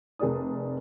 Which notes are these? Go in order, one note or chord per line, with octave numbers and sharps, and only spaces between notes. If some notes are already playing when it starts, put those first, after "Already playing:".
F1 G#4 A#4 D5 D#6